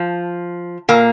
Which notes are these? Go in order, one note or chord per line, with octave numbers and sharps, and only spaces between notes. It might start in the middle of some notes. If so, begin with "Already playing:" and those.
Already playing: F3
A#2 A#3